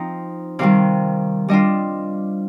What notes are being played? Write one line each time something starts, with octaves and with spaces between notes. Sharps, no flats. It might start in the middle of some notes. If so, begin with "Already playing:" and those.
Already playing: F3 C4 D#4
C3 D#3 G3 F5
G3 D4 F4 D#5